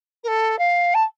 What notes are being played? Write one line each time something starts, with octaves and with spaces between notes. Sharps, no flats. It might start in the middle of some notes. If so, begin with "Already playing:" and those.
A#4
A4
F5
A5